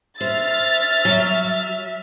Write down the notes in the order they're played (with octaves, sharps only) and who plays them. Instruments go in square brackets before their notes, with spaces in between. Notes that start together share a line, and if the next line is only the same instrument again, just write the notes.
[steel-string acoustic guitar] C5 [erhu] E5 [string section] F6 A6
[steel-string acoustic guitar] F#3